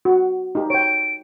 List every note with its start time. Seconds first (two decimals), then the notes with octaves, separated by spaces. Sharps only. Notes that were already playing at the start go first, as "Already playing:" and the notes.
0.05 F#4
0.55 D#4 G4
0.70 C#5 G5 D7